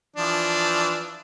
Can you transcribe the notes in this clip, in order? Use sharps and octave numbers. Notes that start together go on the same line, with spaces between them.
E3 F3 D4